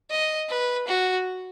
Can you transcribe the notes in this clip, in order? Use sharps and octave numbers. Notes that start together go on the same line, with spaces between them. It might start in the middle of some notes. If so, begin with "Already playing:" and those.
D#5
B4
F#4